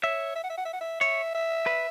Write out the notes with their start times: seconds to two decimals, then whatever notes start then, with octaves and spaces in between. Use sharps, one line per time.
0.03 C#5 E5
0.35 E5
0.44 F#5
0.50 E5
0.58 F#5
0.65 E5
0.73 F#5
0.81 E5
1.01 C#5 E5
1.35 E5
1.66 B4